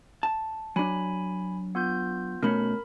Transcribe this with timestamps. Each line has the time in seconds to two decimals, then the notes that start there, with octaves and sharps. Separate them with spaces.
0.23 A5
0.76 F#3 D4 G#5 B5
1.75 B3 F4 G6
2.43 B2 A3 C#4 A#4 B5